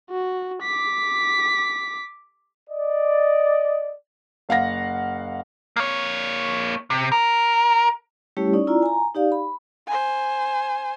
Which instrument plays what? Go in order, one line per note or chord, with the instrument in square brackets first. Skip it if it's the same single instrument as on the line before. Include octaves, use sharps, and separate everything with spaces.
[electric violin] F#4
D6 B6
[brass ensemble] D5 D#5
[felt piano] F#1 F5 F#5 A#6
[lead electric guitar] A#3 C#5
C3
A#4
[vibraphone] G3 A3 C#4 E4 G4 C#5
C#4 D#4 D5
E4 F4 D5 A#5
G#5 A#5
D#4 G4 D5 F5
B5
[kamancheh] C5 G#5